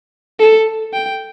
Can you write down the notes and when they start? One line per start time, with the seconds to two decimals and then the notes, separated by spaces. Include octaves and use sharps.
0.40 A4
0.94 G5